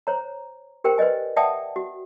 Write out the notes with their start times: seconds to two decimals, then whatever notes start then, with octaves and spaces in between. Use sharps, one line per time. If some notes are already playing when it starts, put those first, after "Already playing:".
0.07 C5 C#5 A#5
0.84 G4 A#4 C5 G5
0.98 B4 C5 D5 D#5 G#5
1.36 D5 E5 F#5 G5 A5 D#6
1.76 F#4